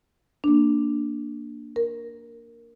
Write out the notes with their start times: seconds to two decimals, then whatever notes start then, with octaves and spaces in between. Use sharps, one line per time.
0.44 A#3 D4
1.76 A#4